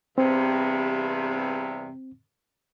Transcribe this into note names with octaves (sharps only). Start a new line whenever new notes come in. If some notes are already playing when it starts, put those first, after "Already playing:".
E2 G2 C3 C4